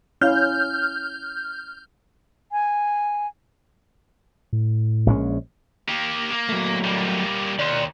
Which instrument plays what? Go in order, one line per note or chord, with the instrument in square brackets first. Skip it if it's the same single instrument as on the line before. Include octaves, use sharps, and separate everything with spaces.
[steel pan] C#4 E4 F5 [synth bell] F6 G6
[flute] G#5
[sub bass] A2
[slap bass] A#1 G#3 C#4
[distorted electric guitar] A#3 G4
A#3
[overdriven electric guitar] F#3 A3
[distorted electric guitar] G3 A#3
[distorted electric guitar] D#2 [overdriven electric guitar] D5 C6